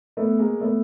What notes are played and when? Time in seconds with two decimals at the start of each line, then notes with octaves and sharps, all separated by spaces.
0.17 A3 B3
0.39 G#3 A#3
0.61 A3 B3